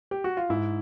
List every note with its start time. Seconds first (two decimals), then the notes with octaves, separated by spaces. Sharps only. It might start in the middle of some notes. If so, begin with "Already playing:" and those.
0.11 G4
0.24 F#4
0.37 F4
0.49 G#2 E4